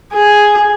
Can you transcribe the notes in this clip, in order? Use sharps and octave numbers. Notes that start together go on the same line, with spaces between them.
G#4